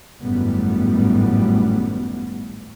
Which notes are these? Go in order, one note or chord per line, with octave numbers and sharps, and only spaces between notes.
G#1 F#2 A2 G3 B3